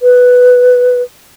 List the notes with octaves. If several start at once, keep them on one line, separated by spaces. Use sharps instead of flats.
B4